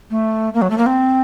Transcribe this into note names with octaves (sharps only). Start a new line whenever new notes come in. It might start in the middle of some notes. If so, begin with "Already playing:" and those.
A3
A#3
F#3
A3
A#3
C4